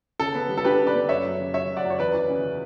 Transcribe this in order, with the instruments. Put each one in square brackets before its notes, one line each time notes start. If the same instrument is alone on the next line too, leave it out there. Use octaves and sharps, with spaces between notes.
[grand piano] C#3 A4
B3
G3
A4
D4 G4 B4
C#3
B4 D5
B3
F#2 C#5 E5
F#3
C#3
F#2 C#5 E5
F#2
D5 F#5
F#3
C#5
E2 B4 D5
E3
C#3